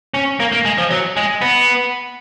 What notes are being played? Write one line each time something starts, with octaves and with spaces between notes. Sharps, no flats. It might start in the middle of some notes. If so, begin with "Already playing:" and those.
C#4
A#3
A#3
G#3
F3
F#3
G#3
B3